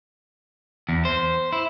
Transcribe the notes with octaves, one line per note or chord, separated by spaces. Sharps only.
E2
C5
E4